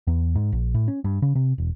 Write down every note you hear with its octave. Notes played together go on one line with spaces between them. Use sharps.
E2
G#2
A#1
A2
C#4
G2
C#3
C3
E1